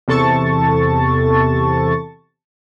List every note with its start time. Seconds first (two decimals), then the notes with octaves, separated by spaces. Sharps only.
0.08 E2 C3 A4 A5 C#6 A6